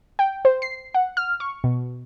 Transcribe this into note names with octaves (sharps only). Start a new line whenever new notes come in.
G5
C5
C7
F#5
F6
C#6
B2